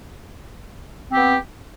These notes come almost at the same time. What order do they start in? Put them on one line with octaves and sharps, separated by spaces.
C4 G4 B3